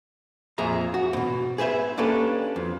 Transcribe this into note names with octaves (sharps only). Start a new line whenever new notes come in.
F2 A#2 G#4 E5 A#5
F#4
E2 B2
G#4 B4 C5 E5
A#3 C#4 D4 G4 A4 B4
F2